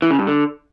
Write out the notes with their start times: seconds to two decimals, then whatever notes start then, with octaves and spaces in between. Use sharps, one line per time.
0.02 E3
0.11 C#3
0.19 G2
0.27 D3